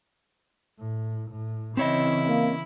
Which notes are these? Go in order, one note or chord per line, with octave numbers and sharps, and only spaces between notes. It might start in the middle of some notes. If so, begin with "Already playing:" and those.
A2
A2
C#3 E3 C4 E4 C#5 D#5
A#3